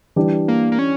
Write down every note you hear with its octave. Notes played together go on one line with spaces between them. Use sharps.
E3 G3 D4 G4
A#3
A#3
C#4